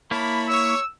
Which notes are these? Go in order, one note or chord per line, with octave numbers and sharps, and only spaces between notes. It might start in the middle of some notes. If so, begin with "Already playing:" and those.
A#3 E4 C#5 A5 B5
C#5 C#6 E6